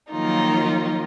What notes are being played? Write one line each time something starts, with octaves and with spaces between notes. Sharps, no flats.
D#3 F3 F#3 A#3 D#4 F4